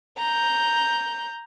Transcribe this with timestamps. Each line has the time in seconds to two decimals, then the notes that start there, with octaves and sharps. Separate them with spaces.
0.18 A#5 G6